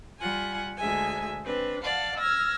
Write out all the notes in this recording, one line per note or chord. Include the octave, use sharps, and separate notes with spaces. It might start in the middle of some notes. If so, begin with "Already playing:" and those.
G3 F4 F#5 G#5
D2 G#3 E5 G#5
C4 D4 B4
D5 F5 F#5 A5
E6 F6 G#6 A#6